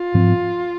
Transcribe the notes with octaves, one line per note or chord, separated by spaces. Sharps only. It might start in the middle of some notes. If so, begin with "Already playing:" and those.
Already playing: F4
G#2 F3 C4